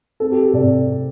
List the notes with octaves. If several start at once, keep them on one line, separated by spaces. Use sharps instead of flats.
C4 A4
G4
A4
C3 D5